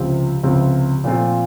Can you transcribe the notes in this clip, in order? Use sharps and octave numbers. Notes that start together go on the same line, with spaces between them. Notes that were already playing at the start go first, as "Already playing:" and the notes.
Already playing: C#2 C3 F3 C4 F4
C#2 C3 F3 C4 F4
A#2 F3 A3 C4 F4